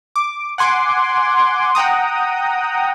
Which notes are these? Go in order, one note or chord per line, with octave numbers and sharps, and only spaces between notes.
D6
F#5 G#5 C6 D6
F#5 G5 A#5 D#6